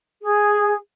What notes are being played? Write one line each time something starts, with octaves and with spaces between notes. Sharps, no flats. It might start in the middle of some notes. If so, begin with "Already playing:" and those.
G#4